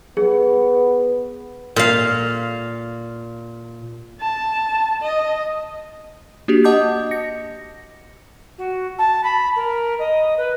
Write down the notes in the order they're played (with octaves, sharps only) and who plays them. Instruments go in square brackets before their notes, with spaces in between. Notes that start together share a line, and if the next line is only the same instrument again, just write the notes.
[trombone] B3 [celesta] G#4
[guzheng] A#2 F5
[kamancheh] A5
D#5
[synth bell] A#3 D4 F#4 G4
D#5 F#5 A5 D6 D#6 G6
A#6 C#7
[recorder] F#4
A5
B5
A#4
D#5
B4